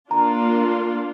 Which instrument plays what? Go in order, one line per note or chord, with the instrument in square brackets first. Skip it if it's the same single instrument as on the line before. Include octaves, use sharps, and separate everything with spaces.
[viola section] A#3 D4 F4 [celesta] A#5